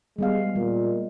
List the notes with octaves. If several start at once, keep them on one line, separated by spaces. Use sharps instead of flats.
G3 G#3 B3 F5
A#2 G#3